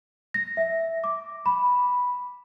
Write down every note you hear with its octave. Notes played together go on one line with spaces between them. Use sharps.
A#6
E5
D6
B5